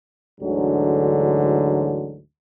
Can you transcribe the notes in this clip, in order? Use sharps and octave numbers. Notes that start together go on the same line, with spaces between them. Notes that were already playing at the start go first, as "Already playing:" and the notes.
D2 G#2 D3 E3 F#3